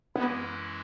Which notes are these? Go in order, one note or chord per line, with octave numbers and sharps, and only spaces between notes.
F#2 E3 G#3 B3 C#4 E4